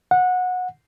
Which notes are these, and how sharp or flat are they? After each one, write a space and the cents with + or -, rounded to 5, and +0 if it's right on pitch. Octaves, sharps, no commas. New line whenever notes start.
F#5 -20